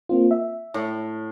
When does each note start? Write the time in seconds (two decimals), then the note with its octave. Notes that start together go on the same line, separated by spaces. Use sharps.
0.09 A#3 C4 F4
0.31 E5
0.74 A2